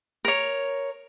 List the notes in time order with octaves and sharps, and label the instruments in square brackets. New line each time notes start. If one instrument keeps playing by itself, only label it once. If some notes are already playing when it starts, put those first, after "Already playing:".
[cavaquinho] A#4 C#5